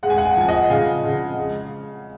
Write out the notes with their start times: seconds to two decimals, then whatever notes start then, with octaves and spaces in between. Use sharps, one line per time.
0.03 G#3 F#5
0.10 G#5
0.18 F#5
0.25 G#5
0.33 F#5
0.37 F3 G#5
0.48 D#5 F#5
0.70 C#3 F5 G#5
1.03 C#3
1.37 G#3